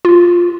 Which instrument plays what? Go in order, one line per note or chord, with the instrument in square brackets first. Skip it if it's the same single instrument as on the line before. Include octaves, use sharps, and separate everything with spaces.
[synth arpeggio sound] F4